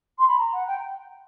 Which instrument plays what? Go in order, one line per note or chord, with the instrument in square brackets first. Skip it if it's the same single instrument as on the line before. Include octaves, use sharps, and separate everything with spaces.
[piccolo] C6
B5
A#5
F#5
G5